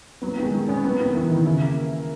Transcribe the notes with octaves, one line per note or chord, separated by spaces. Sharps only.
F#3 B3
B3
D#3
G#3
D#3
B3 C#4
F#3 B3
D#3 B3
D#3 E3
D#3 B3
C#3 E4
A#3
A#3
A#4